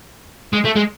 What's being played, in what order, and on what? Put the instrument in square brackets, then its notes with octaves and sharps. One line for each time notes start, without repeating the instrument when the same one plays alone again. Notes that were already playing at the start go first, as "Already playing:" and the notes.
[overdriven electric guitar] G#3
A3
G#3